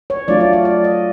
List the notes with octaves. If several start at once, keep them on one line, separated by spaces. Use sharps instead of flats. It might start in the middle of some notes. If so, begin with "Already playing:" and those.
C#5
F#3 A3 D4 F4 D5
D5
D5
D5
D#5